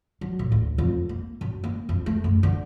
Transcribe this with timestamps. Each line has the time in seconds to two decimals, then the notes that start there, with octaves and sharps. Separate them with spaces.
0.21 F#3
0.39 A2
0.52 D2
0.78 F2
1.09 A#3
1.41 F#2
1.64 A#3
1.89 F2
2.06 A3
2.24 F#2
2.43 D3